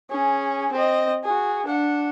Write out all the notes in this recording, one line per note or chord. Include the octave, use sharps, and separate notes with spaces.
C#4 G#4
C4 D#5
F#4 G#4
D4 F#5